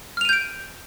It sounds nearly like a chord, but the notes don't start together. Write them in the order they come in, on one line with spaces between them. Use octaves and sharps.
F6 F7 D#7 G6 D7